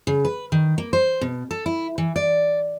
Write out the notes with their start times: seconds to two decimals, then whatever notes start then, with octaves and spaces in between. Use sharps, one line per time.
0.07 C#3
0.25 B4
0.52 D#3
0.78 A#3
0.93 C5
1.21 B2
1.51 A4
1.66 E4
1.98 E3
2.16 D5